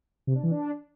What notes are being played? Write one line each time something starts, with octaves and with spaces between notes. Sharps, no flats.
C3
D4
E3
D4